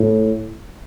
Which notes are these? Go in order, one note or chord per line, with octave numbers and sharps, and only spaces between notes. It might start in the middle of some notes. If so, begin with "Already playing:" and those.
Already playing: A2